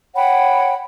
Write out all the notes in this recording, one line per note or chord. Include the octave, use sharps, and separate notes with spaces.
C#5 F#5 G5 B5